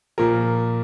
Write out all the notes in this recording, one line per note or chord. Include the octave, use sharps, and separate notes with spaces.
A#2 F3 A#4